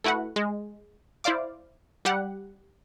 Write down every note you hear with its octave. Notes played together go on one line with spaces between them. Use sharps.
A3 E4 F#4 B4 F#5
G#3
E4 C5 D5 F5 D6
G3 G4 F#5